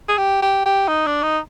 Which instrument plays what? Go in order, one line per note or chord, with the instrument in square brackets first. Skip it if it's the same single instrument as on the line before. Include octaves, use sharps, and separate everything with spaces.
[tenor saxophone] G#4
G4
G4
G4
D#4
D4
D#4